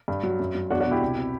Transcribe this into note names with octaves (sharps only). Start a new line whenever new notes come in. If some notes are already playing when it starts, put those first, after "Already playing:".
G2
F#3
F#2
F#3
E2 D4 F#4
D4 F#4
B2
E4 G4
C2
C3